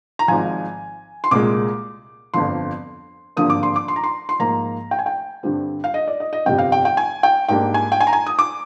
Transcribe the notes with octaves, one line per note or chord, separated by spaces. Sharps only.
A#5
G#1 G#2 F3 G#5
C6
C2 A#2 G#3 D6
G1 F2 D3 F3 C6
G#1 G2 D3 F3 A#3 D#6
D6
C6
D6
C6
A#5
C6
C6
G#2 F3 A#3 A#5
G5
G#5
G5
G2 D3 G3 C4
F5
D#5
D5
D#5
D#5
G1 F2 C3 G3 G5
F5
G5
G5
G#5
G5
G#2 G3 A#3 D4 G5
G#5
G5
G#5
A#5
G#5
D#6
D6